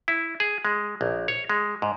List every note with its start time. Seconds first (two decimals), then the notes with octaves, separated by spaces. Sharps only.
0.08 E4
0.40 G#4
0.65 G#3
1.01 A#1
1.28 C#5
1.50 G#3
1.82 G#2